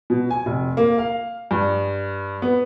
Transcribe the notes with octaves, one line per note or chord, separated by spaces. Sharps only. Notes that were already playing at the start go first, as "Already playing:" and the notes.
B2
G#5
F1
A#3
F5
G2
B3